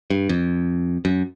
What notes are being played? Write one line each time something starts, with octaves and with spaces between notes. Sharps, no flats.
G2
F2
F#2